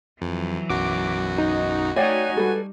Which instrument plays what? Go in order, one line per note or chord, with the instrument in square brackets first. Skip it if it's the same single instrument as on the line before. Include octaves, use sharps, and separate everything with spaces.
[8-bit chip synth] F2 [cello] E3 F#3
[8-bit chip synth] B1 F#2 F#4 [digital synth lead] D6
[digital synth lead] D#4
[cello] A3 D#4 [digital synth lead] F#4 [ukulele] C#5 D5 G5 [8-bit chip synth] G#5
[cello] G3 [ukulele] A4 B4